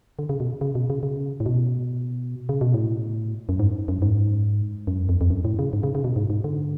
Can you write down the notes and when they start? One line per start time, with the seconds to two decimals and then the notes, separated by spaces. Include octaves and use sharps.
0.19 D3
0.29 C#3
0.40 B2
0.61 C#3
0.75 B2
0.90 C#3
1.03 C#3
1.40 A2
1.46 B2
2.49 C#3
2.61 B2
2.74 A2
3.49 F#2
3.60 G#2
3.88 F#2
4.02 G#2
4.87 F#2
5.09 F2
5.21 F2
5.30 F#2
5.45 A2
5.59 C#3
5.73 G#2
5.83 C#3
5.95 C#3
6.04 B2
6.16 G#2
6.30 G#2
6.44 D3